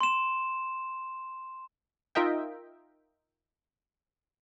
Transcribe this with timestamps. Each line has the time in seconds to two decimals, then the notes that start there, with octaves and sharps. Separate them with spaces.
0.01 C6 E7
2.15 D#4 F4 A#4 D#5 E5 G5